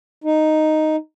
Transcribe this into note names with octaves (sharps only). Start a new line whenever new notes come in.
D#4